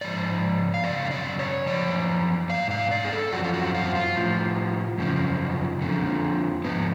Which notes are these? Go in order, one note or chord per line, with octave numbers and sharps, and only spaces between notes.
G#2 F3 D5
F5
F#2 C#3 D5
F5
D5
C#5
F#2 F3 D5
G#2 F3 F5
F5
D5
G#4
A4
F#2 F3 F#4
F4
F#4
F4
F4
A2 F3
F#2 C#3 F3
F2 D3 F3
G#2 F3 B3